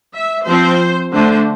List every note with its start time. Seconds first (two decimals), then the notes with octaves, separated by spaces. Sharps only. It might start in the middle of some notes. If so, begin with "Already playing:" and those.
0.15 E5
0.47 F3 C4 C5
1.12 D3 A3 D4 C5